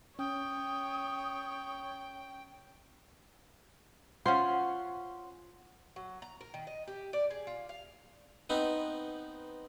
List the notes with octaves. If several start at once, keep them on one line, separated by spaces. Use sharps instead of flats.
C#4 C#5 G5 D#6
C#4 F4 C5 F#5 C6
F#3
A#5
A#4
D#3
D#5
G4
D5
G#4
F4
F5
B3 C4 D#4 B4